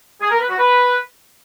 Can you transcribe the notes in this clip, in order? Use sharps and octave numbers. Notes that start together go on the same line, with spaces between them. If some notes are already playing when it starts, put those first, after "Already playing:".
G#4
A#4
B4
F#4
B4